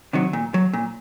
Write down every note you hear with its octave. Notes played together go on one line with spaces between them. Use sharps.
C3 D#3 F#3
A#2
F#3
A#2